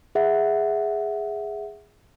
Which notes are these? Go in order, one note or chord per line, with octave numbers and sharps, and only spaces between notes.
G#4 E5 F#5